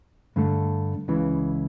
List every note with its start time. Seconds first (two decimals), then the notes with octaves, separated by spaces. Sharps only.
0.36 G2 D3 A3
1.08 C#2 C#3 E3